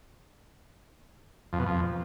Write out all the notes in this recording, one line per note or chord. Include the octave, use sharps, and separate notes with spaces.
F2
B2
F2